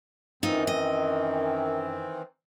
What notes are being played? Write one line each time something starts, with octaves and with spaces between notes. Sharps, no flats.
F#2 D#3 E3 C4 D#4 F4
D#5